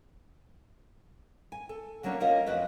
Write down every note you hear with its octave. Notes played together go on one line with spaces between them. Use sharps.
G#5
A4
D3 F#3 A#3 C#4 D4
A#3 C#4 F4 A#4 C#5 D#5
F2 F3 F#4 B4 D#5